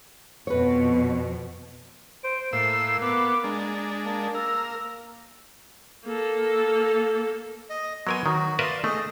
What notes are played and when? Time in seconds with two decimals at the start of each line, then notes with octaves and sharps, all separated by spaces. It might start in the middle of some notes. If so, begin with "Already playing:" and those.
0.47 F2 B2 B4 C#5
2.24 C5 D7
2.53 A2 A#3 E6 C7
3.02 B3 D6
3.44 G#3 D4 A#5
4.05 A#3 A5
4.34 A#4 E6
6.05 A#3 A4
7.70 D#5
8.07 F#3 B3 A#4 G#5 C6
8.26 D#3 F#3 F#4
8.59 A#4 B4 D5 E5 F5 C6
8.84 A3 G#4 D#5